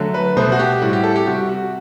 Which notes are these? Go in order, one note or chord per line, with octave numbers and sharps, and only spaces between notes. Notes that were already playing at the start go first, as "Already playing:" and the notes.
Already playing: D3 F#3 A3
B4
B2 A3 C5
F#4
G4
A2 G3 F#4
G4
A4
G4
C3 G3 F#4
F#4